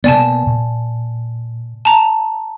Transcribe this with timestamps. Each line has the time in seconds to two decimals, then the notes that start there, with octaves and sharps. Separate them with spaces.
0.04 B2 A#3 B3 D5 G#5 A5
0.47 A#2
1.85 A5 A#5